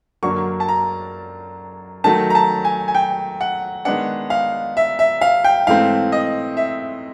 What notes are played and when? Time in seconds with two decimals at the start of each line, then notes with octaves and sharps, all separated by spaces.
0.23 F#2 D3 F#3 A#3 D4 C#6
0.60 A5
0.69 A#5
2.04 D#3 F#3 A3 A5
2.30 A#5
2.35 A5
2.65 G#5
2.88 G#5
2.95 G5
3.41 F#5
3.85 D#3 G#3 B3 D4 F#5
4.30 F5
4.77 E5
4.99 E5
5.21 F5
5.44 G5
5.67 G#2 E3 A3 C4 F5
6.12 D#5
6.57 E5